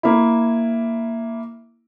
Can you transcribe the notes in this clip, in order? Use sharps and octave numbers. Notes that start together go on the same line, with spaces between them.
A#3 E4